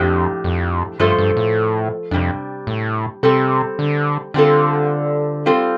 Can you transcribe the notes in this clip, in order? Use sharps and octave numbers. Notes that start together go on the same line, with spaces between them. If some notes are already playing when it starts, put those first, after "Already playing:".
Already playing: F2 A2 F3 D4 G4
F2
G2 F3 A3 F4 A4 C5
G2
A2
F2 C3 G3 D4
A2
C3 G3 C4 A4
D3
D3 G3 C4 F4 A4
G3 C4 F4 A4